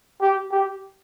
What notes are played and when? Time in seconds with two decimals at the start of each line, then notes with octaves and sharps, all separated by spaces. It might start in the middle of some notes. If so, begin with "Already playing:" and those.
0.21 G4
0.52 G4